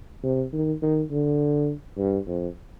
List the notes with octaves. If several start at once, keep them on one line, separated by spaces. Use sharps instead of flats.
C3
D#3
D#3
D3
G2
F2